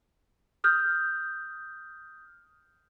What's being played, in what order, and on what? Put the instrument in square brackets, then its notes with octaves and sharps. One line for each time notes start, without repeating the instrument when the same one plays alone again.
[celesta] D#6 F6 G6